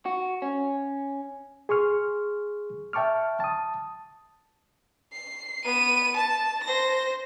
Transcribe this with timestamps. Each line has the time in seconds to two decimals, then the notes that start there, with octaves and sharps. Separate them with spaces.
0.06 F#4
0.42 C#4
1.69 G#4 C6 C#6 F6
2.93 E5 G5 A5 C#6 D6 F6
3.40 A5 D#6
5.12 C7
5.64 B3 D#7
6.17 A5
6.64 C5 A#6